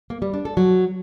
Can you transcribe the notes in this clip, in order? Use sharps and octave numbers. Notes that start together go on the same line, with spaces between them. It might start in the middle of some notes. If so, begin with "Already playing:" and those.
A#3
G3
D4
A4
F#3